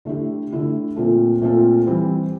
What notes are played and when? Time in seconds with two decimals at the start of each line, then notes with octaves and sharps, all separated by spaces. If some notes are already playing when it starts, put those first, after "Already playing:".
0.05 D3 A3 E4 G4
0.50 D3 A3 E4 G4
0.96 A#2 A3 C4 F4 A4
1.42 A#2 A3 C4 F4 A4
1.87 E3 G3 C4